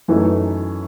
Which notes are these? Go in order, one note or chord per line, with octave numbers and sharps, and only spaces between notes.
F#2 E3 A3 D#4